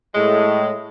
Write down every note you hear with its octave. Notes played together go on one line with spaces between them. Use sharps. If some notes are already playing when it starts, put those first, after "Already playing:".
A2 G#3